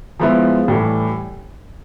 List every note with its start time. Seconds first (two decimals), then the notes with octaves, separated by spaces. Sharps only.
0.20 F3 G#3 B3 E4
0.68 A2 E3 G3